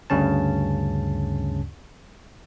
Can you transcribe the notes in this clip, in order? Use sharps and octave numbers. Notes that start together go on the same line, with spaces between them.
D2 G2 C#3 C#4 A5